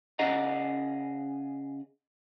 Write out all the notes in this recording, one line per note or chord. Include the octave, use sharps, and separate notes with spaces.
C#3 G#4 D#5 F#5 A#5